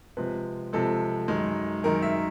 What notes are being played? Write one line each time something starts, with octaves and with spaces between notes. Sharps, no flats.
C3 F3 G#3 B4
C3 F3 G#3 A4
F#2 D#3 G#3
F#2 D#3 G#3 A#4
E5